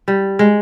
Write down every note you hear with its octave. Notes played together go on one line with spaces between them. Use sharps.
G3
G#3